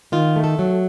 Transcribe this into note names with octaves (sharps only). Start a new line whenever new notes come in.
D#3 F4
A3
A4
F#3